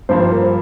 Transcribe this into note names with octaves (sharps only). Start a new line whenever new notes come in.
G2 F3 A#3 C5
C5
A#4
C5